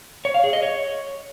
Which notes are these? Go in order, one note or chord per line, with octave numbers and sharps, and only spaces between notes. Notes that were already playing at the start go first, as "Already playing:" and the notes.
C#5
F5
G#4
D#5
C#5